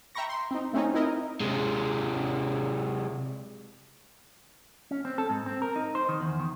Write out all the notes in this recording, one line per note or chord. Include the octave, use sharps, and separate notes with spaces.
E5 G5 A#5 B5 C#6 A#6
C6
C4 D#4
A3 C4 C#4 D#4
D#4 E4 A#4 D#5
C3 G#3
C#4
C4
A4
G#2
C4
A#4
D#4
C5
D#3
E2
D#3